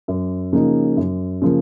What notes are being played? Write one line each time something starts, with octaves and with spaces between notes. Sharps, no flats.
F#2
C#3 F3 A#3 D#4
F#2
C#3 F3 A#3